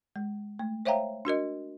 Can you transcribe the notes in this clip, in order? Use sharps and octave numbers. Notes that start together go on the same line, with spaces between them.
G#3
A3
C5 C#5 E5 F5 G5 A#5
D4 F#4 A#4 D#5